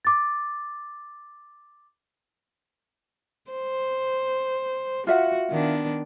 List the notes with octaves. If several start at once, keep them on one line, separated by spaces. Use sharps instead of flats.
D6 A6
C5
F4 F#4 E5 F#5
D#3 B3 D4